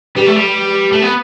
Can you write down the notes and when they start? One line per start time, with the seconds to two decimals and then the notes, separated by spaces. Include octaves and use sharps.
0.16 G3 G4 B4
0.26 A3
0.36 G3
0.92 A3
1.02 B3